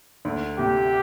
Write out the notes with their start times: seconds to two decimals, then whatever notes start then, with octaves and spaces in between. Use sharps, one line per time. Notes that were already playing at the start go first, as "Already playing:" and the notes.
0.25 D2
0.58 C3 G4